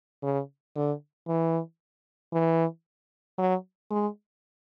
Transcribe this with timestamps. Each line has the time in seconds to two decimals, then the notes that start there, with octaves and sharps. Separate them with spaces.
0.23 C#3
0.76 D3
1.28 E3
2.33 E3
3.38 F#3
3.91 G#3